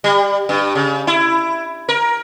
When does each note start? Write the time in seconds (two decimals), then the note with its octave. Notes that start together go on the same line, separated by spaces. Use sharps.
0.04 G3
0.49 G2
0.75 C#3
1.07 E4
1.89 A#4